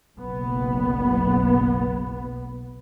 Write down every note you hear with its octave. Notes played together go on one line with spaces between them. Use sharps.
F#1 B1 B3